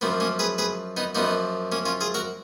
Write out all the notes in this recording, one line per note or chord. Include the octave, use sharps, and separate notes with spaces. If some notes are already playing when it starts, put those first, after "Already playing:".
F#2 F3 A#3 B3
A#3 C#4
G#4 B4
G#4 B4
B3 D#4
F#2 F3 A#3 B3 D#4
A#3 C#4
C#4 F4
F4 G#4
F#4 A#4